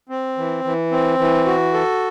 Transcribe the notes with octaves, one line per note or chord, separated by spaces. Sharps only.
C4
E3
E3
C4
E3
F#4
A4